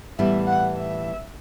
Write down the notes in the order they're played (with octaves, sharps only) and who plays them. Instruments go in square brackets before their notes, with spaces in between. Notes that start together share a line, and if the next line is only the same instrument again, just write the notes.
[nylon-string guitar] A2 E3 G3 B3 [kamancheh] E5
[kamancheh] F#5
E5